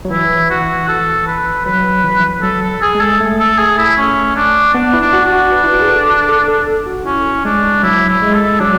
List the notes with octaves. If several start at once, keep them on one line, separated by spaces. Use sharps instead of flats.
F#3
E3 E4
F#4
A4
B4
F#3 B4
E3
F#3
E3
F#3 A4
A4
G#4
G#3
A4
A3
A4
G#4
E4
C#4
D4
B3 D4
E4
D4
F#4
D4
F#4
B4
E4
F#4
G#4
A4
A4
A4
A4
F#4
C#4 E4
G#3 D4
F#3 E4
E4
G#3
A4
F#3 D4